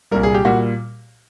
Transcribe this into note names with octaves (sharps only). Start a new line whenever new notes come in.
C2 A#2 G3 A#4
G#4
G4
A#2 G3 F#4